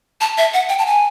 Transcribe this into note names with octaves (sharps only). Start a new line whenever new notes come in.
A5
E5
F#5
G5
A5
G#5